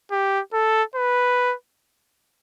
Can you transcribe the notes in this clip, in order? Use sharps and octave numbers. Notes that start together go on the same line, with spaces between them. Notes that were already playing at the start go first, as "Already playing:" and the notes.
G4
A4
B4